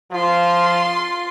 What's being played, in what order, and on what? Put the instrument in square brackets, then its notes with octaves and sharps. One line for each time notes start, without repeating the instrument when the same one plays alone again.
[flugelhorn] F3 [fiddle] F4 C6